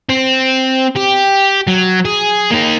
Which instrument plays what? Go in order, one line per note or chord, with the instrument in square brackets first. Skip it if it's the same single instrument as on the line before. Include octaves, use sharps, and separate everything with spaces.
[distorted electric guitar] C4
G4
F#3
G#4
A#3 D#4